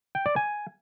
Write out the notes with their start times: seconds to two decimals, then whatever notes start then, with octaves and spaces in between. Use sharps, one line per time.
0.15 G5
0.26 D5
0.36 G#5